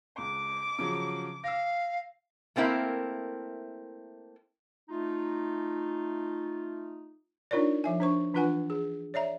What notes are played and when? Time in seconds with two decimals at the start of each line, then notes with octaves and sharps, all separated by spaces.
0.18 C#2 D6
0.79 C#3 F3 F#3
1.44 F5 E6 A#6
2.56 A3 A#3 C4 E4 A#4
4.89 A3 D#4 F4
7.51 D4 D#4 F4 A#4 C#5 D5
7.84 F3 E5 G#5
8.00 D4 C5 C#6
8.34 E3 D4 F4 B4 F#5 G#5
8.70 G#4
9.14 C#5 D5 E5 A#5